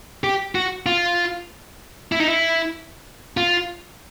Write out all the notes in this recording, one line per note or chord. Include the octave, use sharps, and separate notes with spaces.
G4
F#4
F4
E4
D#4
E4
F4